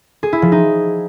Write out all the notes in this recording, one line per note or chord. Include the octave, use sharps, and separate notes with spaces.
G#4
E4
F3
D#4